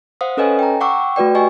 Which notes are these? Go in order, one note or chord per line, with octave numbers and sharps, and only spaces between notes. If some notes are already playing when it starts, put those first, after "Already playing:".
C5 F5 F#5 D#6
C#4 A4 B4 C#5 D#5 G#5
G5 A#5
F#5 G5 C#6 D6 E6
A3 F#4 B4 D5 G5
G4 D#5 G#5 C#6